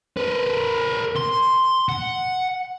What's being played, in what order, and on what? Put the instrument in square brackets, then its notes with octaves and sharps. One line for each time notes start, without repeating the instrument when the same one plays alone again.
[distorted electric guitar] A#4 B4
C6
F#5